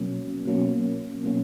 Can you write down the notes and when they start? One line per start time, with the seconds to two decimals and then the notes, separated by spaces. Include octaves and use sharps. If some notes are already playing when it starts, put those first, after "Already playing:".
Already playing: B2 F#3 A#3 C#4
0.45 B2 F#3 A#3 C#4
1.23 B2 F#3 A#3 C#4